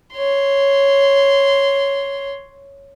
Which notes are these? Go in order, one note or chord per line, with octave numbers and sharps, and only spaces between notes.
C#5 C6